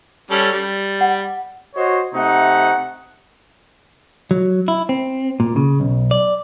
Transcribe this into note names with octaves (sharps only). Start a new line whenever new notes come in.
G3 C#4 A4
G3
F#5
F#4 C5 C#5 D#5
C3 A3 D#4 F#5
F#3
E4
C4
A#2
C#3
B1
D5